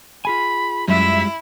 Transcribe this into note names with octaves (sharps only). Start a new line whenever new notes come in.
F4 G#4 G#5 B5
F#2 G3 G#3 E4 F4 E5